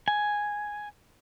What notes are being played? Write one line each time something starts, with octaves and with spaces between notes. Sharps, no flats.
G#5